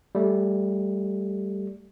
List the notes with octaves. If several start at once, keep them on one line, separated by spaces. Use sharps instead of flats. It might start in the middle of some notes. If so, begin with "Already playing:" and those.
G3 A3